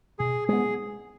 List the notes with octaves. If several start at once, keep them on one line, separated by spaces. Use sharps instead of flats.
B2 G#4
G#3 B3 G#4